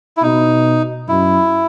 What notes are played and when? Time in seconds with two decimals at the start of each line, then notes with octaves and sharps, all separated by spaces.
0.17 E4
0.22 B2 D#4
1.08 F#2 E4